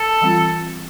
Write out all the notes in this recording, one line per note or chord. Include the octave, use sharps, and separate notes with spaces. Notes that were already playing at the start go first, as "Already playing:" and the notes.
Already playing: A4
E3 G3 C4 F4